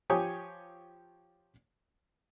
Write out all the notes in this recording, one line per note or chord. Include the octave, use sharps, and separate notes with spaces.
F3 G4 C#5 G#5 D#6